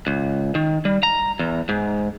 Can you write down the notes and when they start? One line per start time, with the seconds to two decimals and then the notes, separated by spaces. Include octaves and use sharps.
0.07 C#2
0.55 D#3
0.85 G3
1.03 A#5
1.39 E2
1.69 G#2